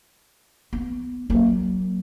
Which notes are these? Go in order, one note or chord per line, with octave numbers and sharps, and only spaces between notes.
B3
F#3 A#3